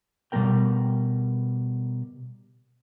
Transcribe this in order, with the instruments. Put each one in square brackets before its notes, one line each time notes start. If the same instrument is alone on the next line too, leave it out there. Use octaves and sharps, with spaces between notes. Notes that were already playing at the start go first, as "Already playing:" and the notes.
[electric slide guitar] B2 G3 G#3 C#4 A#4 G5